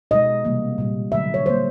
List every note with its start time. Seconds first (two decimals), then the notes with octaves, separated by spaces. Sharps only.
0.11 B2 G#3 D#5
0.45 C3 E3 G3 A#3
0.78 A#2 G3 A#3
1.12 D3 F#3 A3 E5
1.34 C#5
1.46 D3 G3 A#3 C5